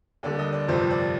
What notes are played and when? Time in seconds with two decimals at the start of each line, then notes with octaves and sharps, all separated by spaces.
0.23 D#2 D3 G3 D5
0.39 D#5
0.53 D5
0.68 G1 F2 C3 F3 C4 C5
0.90 D5